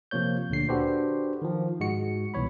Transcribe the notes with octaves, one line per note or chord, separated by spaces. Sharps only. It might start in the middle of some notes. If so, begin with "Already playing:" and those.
C3 F3 A#3 C#5 G6
D2 A#2 D3 C7
D4 F#4 G4 A4 B4 C5
D#3 F3
G#2 G#3 F#4 C#7
C2 B2 E3 C#5 B5